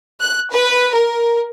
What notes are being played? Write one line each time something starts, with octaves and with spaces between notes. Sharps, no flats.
F#6
B4
A#4